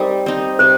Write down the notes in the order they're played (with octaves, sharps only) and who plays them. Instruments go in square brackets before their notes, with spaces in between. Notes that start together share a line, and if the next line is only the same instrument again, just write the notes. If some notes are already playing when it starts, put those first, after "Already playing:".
Already playing: [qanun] G3 C4 D#4 [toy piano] A#4
[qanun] C4 D#4
[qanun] C3 [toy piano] C5